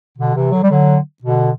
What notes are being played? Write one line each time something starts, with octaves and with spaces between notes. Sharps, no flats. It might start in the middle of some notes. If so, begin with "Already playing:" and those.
B2 D3
C3 E3
D3 F#3
G3
D3 F#3
B2 D3